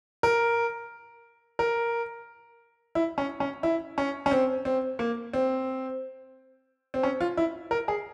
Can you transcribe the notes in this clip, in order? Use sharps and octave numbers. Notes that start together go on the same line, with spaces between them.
A#4
A#4
E4
C#4
C#4
E4
C#4
C#4
C4
C4
A#3
C4
C4
C#4
F4
E4
A#4
G#4